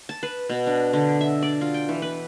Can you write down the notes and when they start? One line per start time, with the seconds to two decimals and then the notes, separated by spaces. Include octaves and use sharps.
0.09 A5
0.23 B4
0.49 B2
0.67 D4
0.93 D3
1.21 E5
1.43 D5
1.61 F4
1.74 G5
1.89 E3
2.02 B4